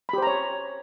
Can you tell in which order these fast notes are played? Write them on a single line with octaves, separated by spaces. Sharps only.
B5 G4 C5 A#5 C#5